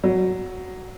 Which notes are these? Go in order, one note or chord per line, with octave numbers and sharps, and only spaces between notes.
F#3